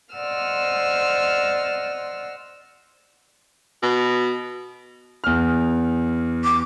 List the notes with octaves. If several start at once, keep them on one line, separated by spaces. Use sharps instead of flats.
C5 D5 D#5 F#5 E6 F6
B2
E2 F6
D6